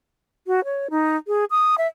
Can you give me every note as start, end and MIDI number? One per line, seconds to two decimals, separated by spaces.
0.47 0.64 66
0.64 0.88 73
0.90 1.16 63
1.27 1.45 68
1.51 1.75 87
1.78 1.87 76